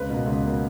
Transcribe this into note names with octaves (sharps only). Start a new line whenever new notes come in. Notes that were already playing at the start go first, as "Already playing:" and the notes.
Already playing: C#2 B4
B2 A#3
C#2
B2 A#3